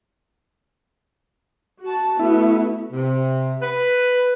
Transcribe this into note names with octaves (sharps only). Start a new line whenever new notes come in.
F#4 A5
A3 B3 E4 F#4
C3
B4